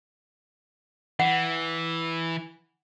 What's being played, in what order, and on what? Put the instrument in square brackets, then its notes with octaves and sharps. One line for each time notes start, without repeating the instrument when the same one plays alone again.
[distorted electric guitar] E3 [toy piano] F#5